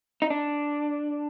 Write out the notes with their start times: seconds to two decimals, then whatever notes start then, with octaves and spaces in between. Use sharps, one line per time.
0.22 D#4
0.30 D4